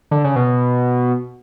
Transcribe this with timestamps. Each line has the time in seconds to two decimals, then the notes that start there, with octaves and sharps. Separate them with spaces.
0.11 D3
0.24 C#3
0.36 B2